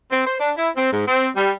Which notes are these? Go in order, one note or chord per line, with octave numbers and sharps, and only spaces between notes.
C4
C5
D4
E4
C4
G#2
C4
G3